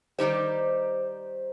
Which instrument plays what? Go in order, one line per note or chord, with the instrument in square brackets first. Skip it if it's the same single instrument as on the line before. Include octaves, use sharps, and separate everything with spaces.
[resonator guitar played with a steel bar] D#3 G3 D#4 G4 [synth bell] C5